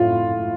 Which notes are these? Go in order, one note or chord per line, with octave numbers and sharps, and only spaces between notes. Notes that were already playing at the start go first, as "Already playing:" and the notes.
Already playing: A2 F4